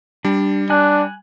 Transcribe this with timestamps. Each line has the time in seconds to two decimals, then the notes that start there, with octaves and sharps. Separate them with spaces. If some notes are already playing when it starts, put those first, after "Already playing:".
0.24 G3 D4
0.70 D4 G#5 F#6